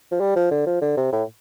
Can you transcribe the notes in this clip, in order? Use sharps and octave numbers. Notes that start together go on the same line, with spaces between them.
F3
G3
F3
D3
F3
D3
C3
A2